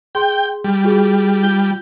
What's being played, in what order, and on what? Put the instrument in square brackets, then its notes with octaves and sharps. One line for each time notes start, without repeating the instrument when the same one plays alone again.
[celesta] G#4 C6 [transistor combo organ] G5
[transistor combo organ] G3
[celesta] F4 F#4 G#4
F4 G6 G7